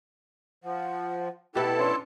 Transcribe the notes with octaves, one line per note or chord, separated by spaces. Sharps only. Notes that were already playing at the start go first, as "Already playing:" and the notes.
F3 F#5
B2 E4 G4 A4 B4 G5 A5
C#4 D4 C#5 C6